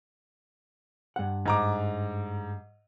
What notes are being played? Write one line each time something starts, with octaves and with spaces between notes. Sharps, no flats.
G2 F#5
G#2 A#5 D6